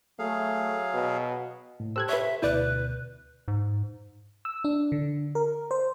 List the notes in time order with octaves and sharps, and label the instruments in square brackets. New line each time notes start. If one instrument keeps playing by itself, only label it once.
[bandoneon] F#3 G#4 F5 [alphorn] A3
[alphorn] B2
[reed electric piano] A2
[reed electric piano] G4 A4 C5 [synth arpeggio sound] E6 F#6 G#6
[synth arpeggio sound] B4 C#5 [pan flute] E5
[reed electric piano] D2 B2 G6 [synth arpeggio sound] E4 D5 [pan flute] B4
[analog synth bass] G#2
[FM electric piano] E6
D4
D3
A#4
C5